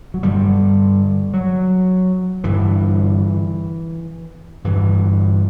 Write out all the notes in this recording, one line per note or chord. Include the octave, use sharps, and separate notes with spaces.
F#3
G2 D3 G3
F#3
G2 D3 E3
G2 D3 E3